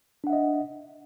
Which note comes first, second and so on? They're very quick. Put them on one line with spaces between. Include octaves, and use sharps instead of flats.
D4 F#5 E5 D#5